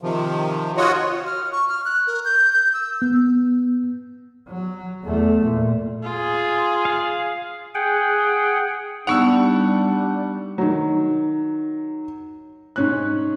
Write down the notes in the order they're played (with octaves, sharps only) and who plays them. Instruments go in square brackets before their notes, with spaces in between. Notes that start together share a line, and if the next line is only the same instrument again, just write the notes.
[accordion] C3 D#3 F3
F4 F#4 C#5 D#5 F#5
[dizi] F6
C#6
F6
F#6
A#4
G6
G6
E6
[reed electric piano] B3
[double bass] F#3
E2 A3
A#2
[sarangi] F4 [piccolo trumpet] G#4
[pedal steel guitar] F5
[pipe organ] G#4 F#5 G5
[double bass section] G3 [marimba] B3 D#4 [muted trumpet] D4 [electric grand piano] F#5 C#6 E6
[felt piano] D#3 F#3
G#2 C#4 F#6